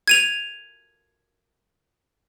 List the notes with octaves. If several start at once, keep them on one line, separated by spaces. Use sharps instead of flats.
G#6 D#7 F7